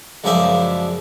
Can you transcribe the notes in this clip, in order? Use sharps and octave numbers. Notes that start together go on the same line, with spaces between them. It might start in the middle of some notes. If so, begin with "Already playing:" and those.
C#2 F#2 F3 G#4 D5 E5